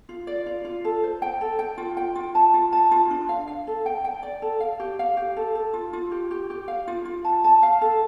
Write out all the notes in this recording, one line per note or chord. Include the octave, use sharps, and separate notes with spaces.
F4
D5
F4
F4
A4
C5
G5
A4
G5
F4
G5
F4
A5
F4
A5
F4
D4
F5
F5
A4
G5
G5
D5
A4
F5
G4
F5
G4
A4
A4
F4
F4
G4
G4
G4
F5
F4
F4
A5
A5
F5
A4